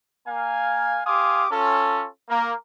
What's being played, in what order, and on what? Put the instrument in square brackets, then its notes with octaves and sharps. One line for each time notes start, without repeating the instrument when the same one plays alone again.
[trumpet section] A#3 F5 G#5
G4 F5 G#5 C6 D6 D#6
C#4 F4 A4
A#3